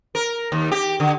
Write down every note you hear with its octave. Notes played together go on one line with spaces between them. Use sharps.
A#4
D#2
G4
D3